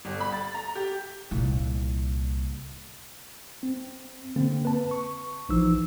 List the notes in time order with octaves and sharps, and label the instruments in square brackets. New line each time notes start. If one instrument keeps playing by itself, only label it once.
[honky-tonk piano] G1
B5
A6
A#5
G4
[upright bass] C2 A#2
[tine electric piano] C4
D3 A#3 C4
B4 A5
C#6
A#1 E3 F3 D#4 E6